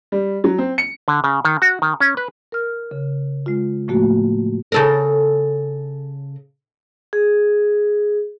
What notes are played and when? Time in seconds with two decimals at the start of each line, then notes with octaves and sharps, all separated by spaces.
0.12 G3
0.44 F#3
0.58 C4
0.78 C#7
1.08 D3
1.24 C#3
1.45 D#3
1.62 F#4
1.82 D#3
2.00 C#4
2.17 B4
2.52 A#4 F6
2.91 C#3
3.46 G#3 F4
3.88 A2 F3 A3 A#3 F#4
4.72 C#3 A4 A#4
7.13 G#4